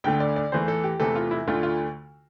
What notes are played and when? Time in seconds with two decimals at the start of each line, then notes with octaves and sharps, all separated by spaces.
0.04 D2 D3 A3 G5
0.20 D5
0.36 D5
0.52 E2 E3 A3 C5
0.68 A4
0.84 G4
1.00 E2 C3 E3 A3 A4
1.15 F4
1.31 E4
1.47 D2 D3 A3 F4
1.63 F4